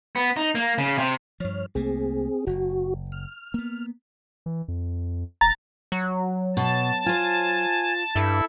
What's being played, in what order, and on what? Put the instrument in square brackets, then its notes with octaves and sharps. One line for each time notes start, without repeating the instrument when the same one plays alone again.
[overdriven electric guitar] B3
D#4
A#3
C#3
C3
[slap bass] G2 F3 [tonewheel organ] C#5 F6
[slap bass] C2 A3 A#3 [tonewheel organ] C4 G#4
[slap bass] F#1 [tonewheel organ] F#4
[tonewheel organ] F6
[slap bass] A#3 B3
[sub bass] E3
F2
[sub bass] E1 [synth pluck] A#5 A6
[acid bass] F#3
[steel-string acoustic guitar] B2 [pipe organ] A5
[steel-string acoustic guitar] F4 C5 [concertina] G#5
[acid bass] G2 [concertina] E4 A4 E5